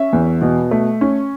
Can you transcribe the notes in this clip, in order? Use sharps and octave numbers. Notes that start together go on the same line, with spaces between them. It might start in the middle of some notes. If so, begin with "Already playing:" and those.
Already playing: C#4 E5
E2
B2
A3
C#4